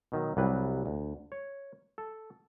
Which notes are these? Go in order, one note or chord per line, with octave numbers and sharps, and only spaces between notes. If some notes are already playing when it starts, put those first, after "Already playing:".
B2 D#3 F#3
C2 F#3 G3 B4
D2
C#5
A4